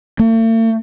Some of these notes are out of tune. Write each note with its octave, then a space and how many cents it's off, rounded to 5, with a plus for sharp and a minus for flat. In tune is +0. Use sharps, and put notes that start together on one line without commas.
A3 +45